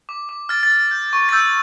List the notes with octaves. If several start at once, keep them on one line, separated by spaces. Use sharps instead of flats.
D6
D6
F6 A6
A6
F6
G6
C#6
A6
E6 G6